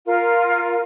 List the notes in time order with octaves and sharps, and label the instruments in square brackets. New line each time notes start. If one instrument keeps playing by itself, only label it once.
[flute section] F4 A#4 F5